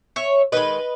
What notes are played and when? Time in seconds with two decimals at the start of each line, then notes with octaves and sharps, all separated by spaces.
0.16 C#5 E5
0.52 D#3 G#3 B4 D#5